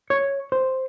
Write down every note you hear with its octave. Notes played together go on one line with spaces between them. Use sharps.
C#5
C5